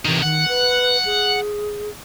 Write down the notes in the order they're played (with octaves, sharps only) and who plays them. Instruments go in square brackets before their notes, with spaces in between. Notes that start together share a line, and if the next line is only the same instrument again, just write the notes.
[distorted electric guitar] C3 D#3 [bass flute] E3
[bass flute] D#3 [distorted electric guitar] F#5
[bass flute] B4
G#4